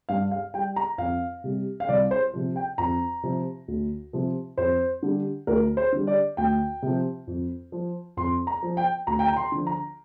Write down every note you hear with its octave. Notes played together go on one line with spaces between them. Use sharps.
G2 F5
F5
G3 G5
A#5
F2 F5
C3 G3
F5
C2 D5
C5
C3 F3
G5
F2 A#5
C3 F3
D2
C3 F3
F2 C5
D3 G3
D2 A#4
C5
D3 G3
D5
D2 G5
C3 F3
F2
F3
F2 C6
A#5
F3
G5
D2 A#5
G5
A#5
C6
D3 F3
A#5